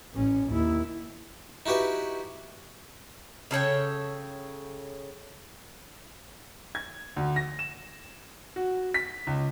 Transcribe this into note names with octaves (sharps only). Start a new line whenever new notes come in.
A1 C#4
D#2 E4
D#4 E4 F#4 G4 B4
C#3 A4 C#5 G5
G#6
D2
A#6
E7
F#4
B6
C#2